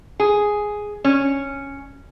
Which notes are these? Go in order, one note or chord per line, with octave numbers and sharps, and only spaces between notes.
G#4
C#4